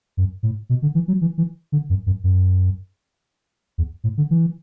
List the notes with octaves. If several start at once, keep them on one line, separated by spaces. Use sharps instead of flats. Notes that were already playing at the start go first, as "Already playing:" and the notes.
F#2
A2
B2
D3
E3
F#3
E3
E3
D3
F#2
F#2
F#2
E2
A2
D3
E3